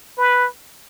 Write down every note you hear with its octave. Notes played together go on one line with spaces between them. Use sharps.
B4